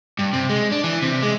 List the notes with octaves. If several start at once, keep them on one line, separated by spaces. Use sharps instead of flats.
G2
C3
G#3
D4
E3
C3
G#3